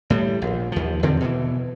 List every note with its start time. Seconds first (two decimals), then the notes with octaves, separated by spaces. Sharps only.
0.10 A2 G3
0.42 A#1
0.72 D#2 F3
1.03 E2 D3 D#3 C4
1.20 B2 E3